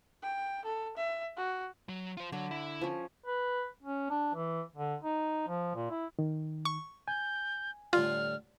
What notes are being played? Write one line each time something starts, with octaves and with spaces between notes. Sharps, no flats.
G5
A4
E5
F#4
F#3
F4 C5
D3 F#3
E4
F3 C#4
B4
C#4
D4
E3
D3
D#4
F3
A#2
E4
D#3
C#6
G#5 G6
A2 D3 G3 F4 F6